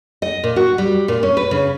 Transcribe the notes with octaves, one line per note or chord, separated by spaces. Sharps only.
D#5
A#2
F#4
G3
A#2
C#4
B4
C#3